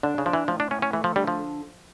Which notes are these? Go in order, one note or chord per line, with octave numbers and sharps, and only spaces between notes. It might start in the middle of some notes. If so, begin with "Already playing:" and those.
D3 D4
C#3
F3 D4
E3
A2 F3
D4
A2 C#4
C#4
E3 A3
F3
D3 G3
F3